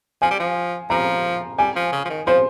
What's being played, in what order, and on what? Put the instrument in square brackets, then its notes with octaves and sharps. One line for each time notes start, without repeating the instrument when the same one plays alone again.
[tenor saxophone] F3 [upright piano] G#5
[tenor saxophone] G3
F3
[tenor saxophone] F3 [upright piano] A#5
[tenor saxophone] G3 [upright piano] G#5
[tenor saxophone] F3
C#3
F3
D#3
[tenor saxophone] F3 [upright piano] C5